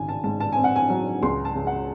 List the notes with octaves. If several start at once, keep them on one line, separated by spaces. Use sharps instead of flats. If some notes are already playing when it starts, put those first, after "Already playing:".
Already playing: G#1 C#3 G#5
A5
G#2 A5
A5
C4 G#5
F#5
G#5
F#3
C#2 C6
A5
C#3
F#5